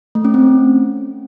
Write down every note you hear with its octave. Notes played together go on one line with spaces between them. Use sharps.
A3
C#4
C4